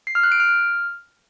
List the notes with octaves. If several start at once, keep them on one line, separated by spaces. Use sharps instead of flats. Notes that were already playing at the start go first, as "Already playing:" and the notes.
C7
F6
F#6
D7
F6